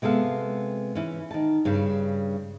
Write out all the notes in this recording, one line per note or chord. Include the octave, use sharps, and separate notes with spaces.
C3 G#3 B3 A4 F5
E3 C#4
D#3 A5
G2 C#3